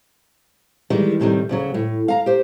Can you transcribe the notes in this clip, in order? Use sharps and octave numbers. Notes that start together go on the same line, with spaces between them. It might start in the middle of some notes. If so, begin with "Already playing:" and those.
D#3 E3 G3 G#3
A2 C3 D#3 G3
D2 C#3 F#3
A2
F5 A#5
G4 C5